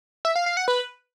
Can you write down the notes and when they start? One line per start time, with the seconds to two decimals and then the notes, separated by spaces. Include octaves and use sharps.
0.25 E5
0.36 F5
0.46 F5
0.57 F#5
0.68 B4